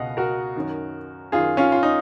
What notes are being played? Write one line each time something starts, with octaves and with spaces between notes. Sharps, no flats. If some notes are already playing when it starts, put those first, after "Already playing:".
Already playing: C#2 B2 D#5 F5 F#5
F#4 A#4
F#2 D#3
F#2 D#3 F4 G#4
C#4 F4
F4
D#4